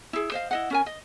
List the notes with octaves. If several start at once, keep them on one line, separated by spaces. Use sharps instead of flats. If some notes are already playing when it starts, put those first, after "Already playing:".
E4 G#4
C5 D#5 F5
E4 D#5 F#5
C#4 A#4 G#5
D#5